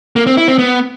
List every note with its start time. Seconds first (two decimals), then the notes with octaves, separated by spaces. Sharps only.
0.16 A#3
0.27 C4
0.37 E4
0.48 C4
0.59 B3